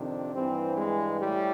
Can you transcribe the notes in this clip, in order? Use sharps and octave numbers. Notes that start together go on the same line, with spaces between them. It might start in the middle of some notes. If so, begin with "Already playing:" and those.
Already playing: F2 C3 D#3 D4
G2 E3 C4
G#3
A2 G3